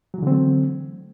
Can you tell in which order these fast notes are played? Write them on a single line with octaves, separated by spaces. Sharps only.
F#3 E3 D3 C4 A3